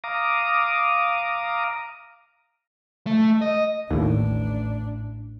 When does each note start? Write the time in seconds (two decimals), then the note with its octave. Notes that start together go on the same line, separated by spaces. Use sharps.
0.04 F5 A#5 D6 D#6
3.07 A3
3.42 D#5
3.91 A1 D#2 A2 D4